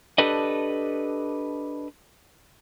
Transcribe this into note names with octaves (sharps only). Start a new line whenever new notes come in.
D4 G4 A4 B4 D5 D#5